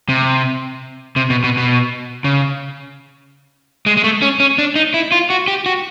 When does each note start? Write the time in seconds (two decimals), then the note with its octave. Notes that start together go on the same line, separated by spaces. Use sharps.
0.09 C3
1.16 C3
1.30 B2
1.44 B2
1.57 B2
2.24 C#3
3.86 G#3
3.97 G#3
4.04 A3
4.22 C#4
4.40 C#4
4.58 D4
4.76 D#4
4.94 E4
5.12 F4
5.30 F#4
5.48 G4
5.66 F#4